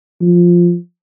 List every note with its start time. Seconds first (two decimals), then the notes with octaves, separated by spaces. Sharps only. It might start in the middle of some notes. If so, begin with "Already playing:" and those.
0.21 F3